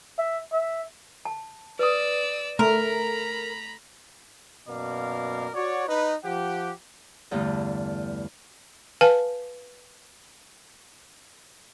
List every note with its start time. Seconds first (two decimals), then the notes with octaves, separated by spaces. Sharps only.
0.19 E5
0.52 E5
1.25 A5
1.79 B4 D5 D#6 E6
2.59 A3 A#4 A#5 B5
4.68 F#2 B2 A#3 A#4 D5 F5
5.54 F#4 C#5 D5
5.87 D#4 B4
6.24 F3 G4 F#5
7.31 E2 G2 D3 A3
9.01 B4 F5 G#5 A5